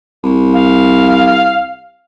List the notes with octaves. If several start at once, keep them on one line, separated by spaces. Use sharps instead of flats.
C2
F5